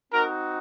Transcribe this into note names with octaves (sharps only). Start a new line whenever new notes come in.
C4 D#4 F#4 A#4